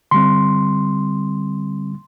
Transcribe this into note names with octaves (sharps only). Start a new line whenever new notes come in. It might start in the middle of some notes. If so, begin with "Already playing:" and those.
D3 G3 C4 C6